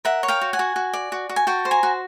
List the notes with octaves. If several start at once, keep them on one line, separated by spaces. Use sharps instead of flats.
A#4 E5 F#5
C#5
F5 G5
F#4
F#5 G#5
F#4
F#4
D5
F#4
F#4
G#5
F#4 G5 A5
C5
G#5 A#5
F#4